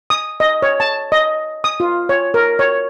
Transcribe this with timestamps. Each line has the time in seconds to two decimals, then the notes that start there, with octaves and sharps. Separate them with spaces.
0.10 D#6
0.40 D#5
0.62 C#5
0.80 A5
1.12 D#5
1.64 D#6
1.80 F4
2.09 C#5
2.34 A#4
2.59 C#5